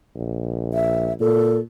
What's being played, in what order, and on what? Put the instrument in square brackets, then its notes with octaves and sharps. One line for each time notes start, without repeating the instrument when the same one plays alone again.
[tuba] A#1
[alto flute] E5
[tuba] A#2 [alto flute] A4